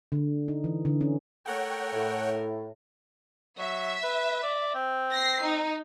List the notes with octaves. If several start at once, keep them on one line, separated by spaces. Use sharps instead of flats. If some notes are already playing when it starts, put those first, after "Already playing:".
D3
D#4
E3
D3
C#4
A3 A#4 C#5 F#5 G5
A2
F#3 E5
B4
D5
C4
A#6 C7
D#4